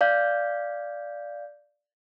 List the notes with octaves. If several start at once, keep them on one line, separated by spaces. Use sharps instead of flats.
D5 F5 G6